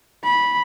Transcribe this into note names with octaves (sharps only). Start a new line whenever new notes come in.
B5